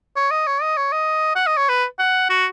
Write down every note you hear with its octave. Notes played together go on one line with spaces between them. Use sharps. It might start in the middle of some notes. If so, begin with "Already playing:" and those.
C#5
D#5
C#5
D#5
C#5
D#5
F#5
D#5
C#5
B4
F#5
F#4